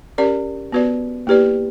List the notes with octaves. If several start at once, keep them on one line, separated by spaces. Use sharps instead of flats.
C#4 G4 A#4 D5
B3 F#4 B4 D5
A#3 E4 G4 B4 D5